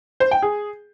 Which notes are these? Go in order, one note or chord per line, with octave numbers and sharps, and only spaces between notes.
C5
G5
G#4